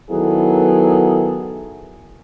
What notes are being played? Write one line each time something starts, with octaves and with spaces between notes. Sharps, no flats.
D#3 F#3 B3 E4 G#4 A4